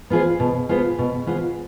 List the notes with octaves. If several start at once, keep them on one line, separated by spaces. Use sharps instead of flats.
B3 F4 G#4 C5
B2
B3 F4 G#4 C5
B2
B3 F4 G#4 C5